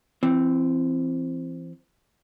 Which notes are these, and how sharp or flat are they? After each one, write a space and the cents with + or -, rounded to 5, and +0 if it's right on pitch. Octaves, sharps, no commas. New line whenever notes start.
E3 +30 C4 +0